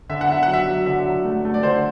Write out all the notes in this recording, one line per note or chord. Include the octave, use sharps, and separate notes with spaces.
D3 E5
F#5
D3 E5
F#3 F#5
E5
F#3
D3 E5
F#3
A3
A3
D5
D3 C5